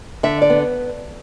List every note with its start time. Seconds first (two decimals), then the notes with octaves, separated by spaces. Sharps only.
0.23 D3 E5
0.42 D5
0.50 B3